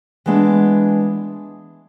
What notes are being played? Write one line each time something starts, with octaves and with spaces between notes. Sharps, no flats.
E3 G#3 B3 D4